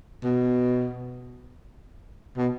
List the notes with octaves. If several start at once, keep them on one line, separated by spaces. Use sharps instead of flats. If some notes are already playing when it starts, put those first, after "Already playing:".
B2
B2